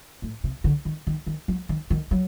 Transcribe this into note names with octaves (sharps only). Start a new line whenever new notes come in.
A2
C3
D3
D#3
D#3
D#3
F#3
D#3
D#3
F#3